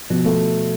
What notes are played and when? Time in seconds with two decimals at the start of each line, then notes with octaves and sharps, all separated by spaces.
0.10 B2 F3
0.25 A3